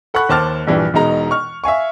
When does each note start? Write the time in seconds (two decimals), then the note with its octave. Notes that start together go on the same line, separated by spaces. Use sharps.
0.14 A4 F#5 B5 C#6 F#6
0.29 D#2 C5 A5 D6 F6 A6
0.67 A#1 G2 E3 G3
0.94 E1 B2 G#3 D#4 A#5
1.31 C#6 F6
1.64 E5 F5 G#5 C#6